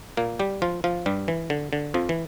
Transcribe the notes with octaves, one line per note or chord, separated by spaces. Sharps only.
A#2 A#3
G3 G4
F3 F4
F3 F4
G2 G3
E3
D3
D3
F2 F3
E3